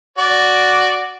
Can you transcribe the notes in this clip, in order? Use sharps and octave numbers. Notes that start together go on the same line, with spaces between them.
F#4 D5